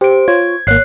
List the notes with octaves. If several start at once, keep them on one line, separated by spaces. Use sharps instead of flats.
G4 C5 D7
F4 C5 C#5 G#6
G#1 A#3 C#5 F#6 C7